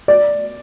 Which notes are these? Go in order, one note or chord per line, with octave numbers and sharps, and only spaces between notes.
D5